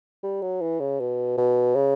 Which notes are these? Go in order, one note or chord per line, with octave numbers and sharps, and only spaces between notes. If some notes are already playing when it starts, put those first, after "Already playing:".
G3
F#3
E3
C#3
B2
B2
C#3